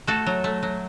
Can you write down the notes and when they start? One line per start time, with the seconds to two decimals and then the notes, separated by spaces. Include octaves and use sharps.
0.07 A3 F#4 A4
0.26 F#3
0.44 A3
0.63 F#3